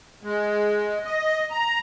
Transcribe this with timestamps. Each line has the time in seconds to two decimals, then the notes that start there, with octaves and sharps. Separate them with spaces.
0.23 G#3
1.05 D#5
1.51 A#5